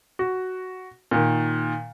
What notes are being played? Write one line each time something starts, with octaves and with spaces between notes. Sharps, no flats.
F#4
A#2 D#3